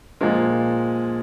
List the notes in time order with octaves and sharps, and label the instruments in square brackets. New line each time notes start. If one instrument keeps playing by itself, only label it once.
[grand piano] A#2 F3 G#3